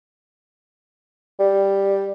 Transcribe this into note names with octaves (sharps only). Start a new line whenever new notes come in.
G3